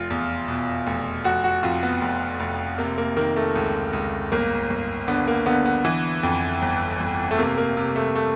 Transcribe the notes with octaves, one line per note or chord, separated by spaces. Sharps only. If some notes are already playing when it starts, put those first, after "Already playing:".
Already playing: F1 F4
E2
B2
F1
F1 F#4
F#4
F2 F4
B3
F1
F1
C3 A#3
A#3
D#3 A#3
A3
C#2
C#2
G1 A#3
G1
D3 B3
A#3
D3 B3
B3
E3
F2
G1
G1
A3
C3 A#3
A#3
C3
A3
A3